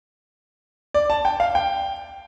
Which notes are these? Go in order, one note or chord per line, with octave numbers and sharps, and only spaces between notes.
D5
A5
G5
F5
G5